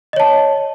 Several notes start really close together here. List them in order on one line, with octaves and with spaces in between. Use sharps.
D#5 C#5 A5